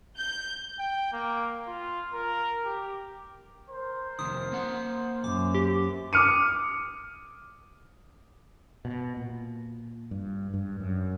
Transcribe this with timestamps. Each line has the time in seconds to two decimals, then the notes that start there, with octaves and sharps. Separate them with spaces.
0.17 G6
0.79 G5
1.13 A#3
1.67 F4
2.13 A#4
2.65 G4
3.70 A#4 C5
4.19 F2 C3 D#3 D#6
4.52 A#3 F#5
5.24 F#2 D6
5.55 G4
6.13 D6 D#6 F6 C#7 D#7
8.85 B2
9.17 A#2
10.11 G2
10.54 G2
10.80 F#2